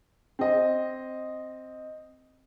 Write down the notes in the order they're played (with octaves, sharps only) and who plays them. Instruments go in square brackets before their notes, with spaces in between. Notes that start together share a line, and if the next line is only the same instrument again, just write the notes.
[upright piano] C4 D#5